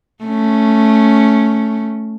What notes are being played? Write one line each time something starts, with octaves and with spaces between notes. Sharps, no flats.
A3 C#4